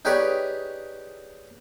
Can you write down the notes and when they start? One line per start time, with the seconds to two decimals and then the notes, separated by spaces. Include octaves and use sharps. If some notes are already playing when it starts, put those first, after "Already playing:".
0.05 D#4 G4 G#4 B4 C#5 D5